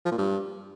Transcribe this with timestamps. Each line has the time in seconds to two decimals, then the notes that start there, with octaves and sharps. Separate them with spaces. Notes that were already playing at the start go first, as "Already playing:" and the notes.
0.05 F3
0.12 A#2
0.18 G2